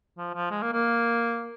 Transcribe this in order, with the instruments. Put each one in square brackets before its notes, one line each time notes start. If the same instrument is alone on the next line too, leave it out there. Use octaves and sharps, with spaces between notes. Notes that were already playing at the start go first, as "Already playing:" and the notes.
[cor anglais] F3
F3
G#3
A#3
A#3